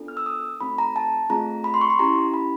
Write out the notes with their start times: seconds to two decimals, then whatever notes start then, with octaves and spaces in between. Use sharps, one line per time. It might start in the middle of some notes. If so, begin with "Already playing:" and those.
Already playing: B3 D4 F4 A4
0.08 F6
0.17 E6
0.26 D#6
0.60 A3 C4 D#4 F#4 A4 B5
0.78 A#5
0.96 A5
1.30 A3 C4 F4 G#4 A#5
1.64 B5
1.74 C6
1.81 C#6
1.90 C6
1.99 C#4 E4 G4 A#5
2.34 B5